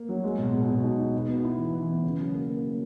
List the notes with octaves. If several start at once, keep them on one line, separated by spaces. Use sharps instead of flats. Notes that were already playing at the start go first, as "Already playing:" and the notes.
Already playing: A#3
F#3
G#3
B2
B2
B2
D#4
D#4
B3
B3
E4
E3
E3
B3
C#3
F#3
A#3
A#3
F#3